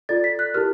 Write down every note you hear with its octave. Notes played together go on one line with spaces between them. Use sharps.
F4 A4 D5 A6
B6
F#6
E4 G4 A#4 F6